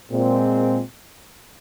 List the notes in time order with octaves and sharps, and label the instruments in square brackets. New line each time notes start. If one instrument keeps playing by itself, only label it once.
[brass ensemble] A#2 G#3 C4